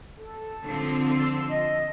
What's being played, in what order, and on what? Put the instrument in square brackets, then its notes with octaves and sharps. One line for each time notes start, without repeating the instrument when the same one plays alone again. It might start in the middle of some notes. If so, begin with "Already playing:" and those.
[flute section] A4
[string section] D3 F3 C4
[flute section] A5 C6 E6
D#5